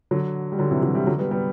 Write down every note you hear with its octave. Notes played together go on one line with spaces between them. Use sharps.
D3 F#3
G3
D3 F#3
C3 E3
D3 F#3
E3 G3
D3 F#3
G3 B3
G3 B3